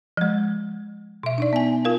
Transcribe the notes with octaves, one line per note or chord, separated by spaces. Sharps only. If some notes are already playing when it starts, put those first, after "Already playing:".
F3 G#3
B2 E5
D4 D#4 D5
B3 G#5
F4 A#4 F5